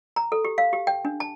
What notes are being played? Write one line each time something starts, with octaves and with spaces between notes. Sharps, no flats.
A#5
A4
G4
F5
G4
G5
D4
A5